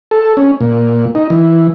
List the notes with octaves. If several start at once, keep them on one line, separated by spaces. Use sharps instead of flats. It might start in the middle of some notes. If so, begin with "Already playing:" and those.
A4
C#4
A#2
D#4
E3